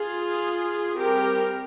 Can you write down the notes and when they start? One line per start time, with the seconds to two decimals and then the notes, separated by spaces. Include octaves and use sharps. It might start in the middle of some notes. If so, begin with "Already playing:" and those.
Already playing: F4 G#4
0.97 G3 C4 G4 A#4